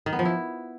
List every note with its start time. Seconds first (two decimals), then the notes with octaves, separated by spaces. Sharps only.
0.06 D#3
0.13 B3
0.19 F3
0.25 E4